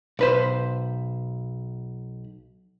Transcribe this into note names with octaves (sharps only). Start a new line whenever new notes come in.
B1 B4 C5